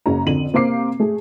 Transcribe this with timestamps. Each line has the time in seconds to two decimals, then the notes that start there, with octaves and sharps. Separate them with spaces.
0.06 F#1 C#4 A#5
0.26 F2 D3 D#7 F#7
0.53 C3 A#3 C5 F5 D6 C7
1.00 A3 G#4